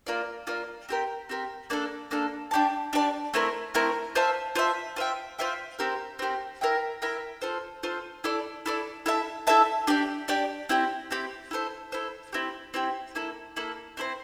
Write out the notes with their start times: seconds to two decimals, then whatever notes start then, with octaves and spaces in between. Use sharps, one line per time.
0.07 A#3 F4 A#4 D5
0.47 A#3 F4 A#4 D5
0.89 C4 G4 A#4
1.29 C4 G4 A#4
1.70 A#3 D4 A4
2.11 A#3 D4 A4
2.51 D4 G4 D5 A5
2.93 D4 G4 D5 A5
3.34 A3 C4 E4 A#4
3.74 A3 C4 E4 A#4
4.15 F4 C5 E5 A5
4.56 F4 C5 E5 A5
4.96 F4 C5 E5 G5
5.39 F4 C5 E5 G5
5.79 C4 G4 A#4
6.19 C4 G4 A#4
6.61 E4 A#4 E5 G5
7.02 E4 A#4 E5 G5
7.42 F4 A4 C5
7.83 F4 A4 C5
8.24 E4 A4 D5
8.66 E4 A4 D5
9.06 E4 A4 E5 A5
9.47 E4 A4 E5 A5
9.87 D4 G4 D5
10.28 D4 G4 D5
10.69 C4 E4 G4
11.11 C4 E4 G4
11.51 E4 A4 C5
11.92 E4 A4 C5
12.33 C4 E4 G4
12.74 C4 E4 G4
13.15 A#3 E4 A4
13.56 A#3 E4 A4
13.97 C4 E4 A4 C5